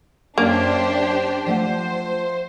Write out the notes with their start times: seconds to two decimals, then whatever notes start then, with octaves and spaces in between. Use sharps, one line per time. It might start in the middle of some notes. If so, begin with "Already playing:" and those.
0.38 F#2 A#3 D4 G4 C5
1.46 F3 A3 C5 F#5